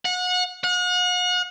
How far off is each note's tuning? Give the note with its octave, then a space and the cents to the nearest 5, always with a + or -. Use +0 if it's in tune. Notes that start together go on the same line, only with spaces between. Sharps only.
F#5 -30
F#5 -40